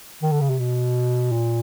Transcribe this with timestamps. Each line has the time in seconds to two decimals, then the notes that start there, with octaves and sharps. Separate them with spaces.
0.23 D#3
0.32 D3
0.41 C#3
0.50 C3
0.59 B2
1.32 A#2